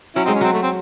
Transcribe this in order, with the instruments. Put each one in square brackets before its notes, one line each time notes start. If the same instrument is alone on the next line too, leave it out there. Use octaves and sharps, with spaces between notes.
[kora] F#3 [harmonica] C#4 E4
[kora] G#3 [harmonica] C4 D#4
[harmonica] C#4
[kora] F#3 [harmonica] C4
[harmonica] A3
C4